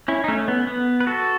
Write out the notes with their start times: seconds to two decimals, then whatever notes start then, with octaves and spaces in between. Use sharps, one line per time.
0.08 C#4 E4
0.24 D#4
0.28 A3 C#4
0.48 B3
0.67 B3
1.00 B4
1.07 F#4 A4